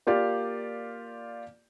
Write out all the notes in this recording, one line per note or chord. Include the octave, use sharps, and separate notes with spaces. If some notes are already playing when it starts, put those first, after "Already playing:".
A#3 F4 G4 D5